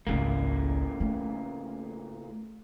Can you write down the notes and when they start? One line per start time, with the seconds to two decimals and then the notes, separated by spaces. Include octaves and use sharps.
0.07 G#1 C#2 A2 C#3 A#3
1.00 A3